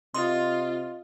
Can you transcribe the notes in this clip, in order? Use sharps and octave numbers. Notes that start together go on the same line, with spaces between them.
C3 F4 D#5 C6